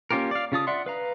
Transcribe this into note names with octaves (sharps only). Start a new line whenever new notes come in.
A#3 C#4 F4 G4 A#4
D5 F5
C#3 F4 A5 D#6
D5 E5 F#5 C6
B4 F5 A#5